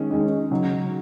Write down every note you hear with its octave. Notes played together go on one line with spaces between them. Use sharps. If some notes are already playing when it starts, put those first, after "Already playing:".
Already playing: D#3 G#3 C#4
D#3 G#3 C#4
C#3 F#3 D#4